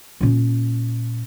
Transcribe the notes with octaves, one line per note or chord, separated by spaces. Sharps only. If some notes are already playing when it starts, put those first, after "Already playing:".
A#2 C#4